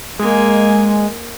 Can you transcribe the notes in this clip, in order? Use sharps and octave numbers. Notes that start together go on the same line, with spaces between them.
G#3 A#3 G#5